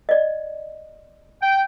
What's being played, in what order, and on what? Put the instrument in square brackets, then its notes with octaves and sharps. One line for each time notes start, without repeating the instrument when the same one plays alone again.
[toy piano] D5 D#5
[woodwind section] G5